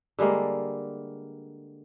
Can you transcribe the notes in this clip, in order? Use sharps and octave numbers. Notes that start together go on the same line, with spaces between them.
D3 G3 G#3 A#3